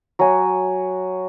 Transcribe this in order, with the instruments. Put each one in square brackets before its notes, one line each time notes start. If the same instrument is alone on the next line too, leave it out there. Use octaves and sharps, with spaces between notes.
[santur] F#3 G#5